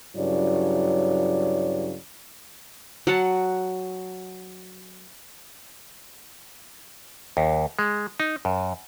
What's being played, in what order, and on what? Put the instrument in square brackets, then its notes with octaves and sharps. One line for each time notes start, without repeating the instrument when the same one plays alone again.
[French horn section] G2 C#3 F#3 E4 C#5 D5
[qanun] F#3 F#5 A5
[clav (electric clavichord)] D#2
G#3
D#4
F#2